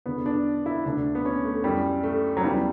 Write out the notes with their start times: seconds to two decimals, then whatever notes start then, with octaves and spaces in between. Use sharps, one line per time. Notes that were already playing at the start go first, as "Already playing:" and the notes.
0.06 E2 D3 B3
0.26 D4
0.66 E4
0.85 D2 D3 D4
1.15 B3
1.25 C#4
1.45 A3
1.64 F#2 E3 G3
2.03 A3
2.37 F#3
2.43 E2 C#3 E3 G3